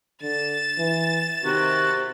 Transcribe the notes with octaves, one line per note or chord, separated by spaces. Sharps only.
D3 A6 E7
E3
C3 D#3 F#4